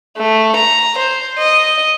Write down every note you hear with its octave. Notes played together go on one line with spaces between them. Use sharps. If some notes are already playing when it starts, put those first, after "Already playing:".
A3
A#5
C5
D#5